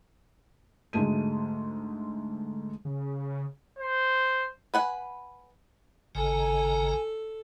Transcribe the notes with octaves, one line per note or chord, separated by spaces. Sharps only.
D2 G#2 G#3 A3 D#7
C#3
C5
B4 F#5 G#5
G#1 C#3 A4 G#5 A#5